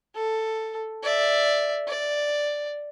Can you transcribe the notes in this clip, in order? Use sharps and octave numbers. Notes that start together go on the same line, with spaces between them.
A4
D5 E5
D5